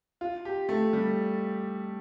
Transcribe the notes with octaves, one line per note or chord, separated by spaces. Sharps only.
F4
G4
A3
G3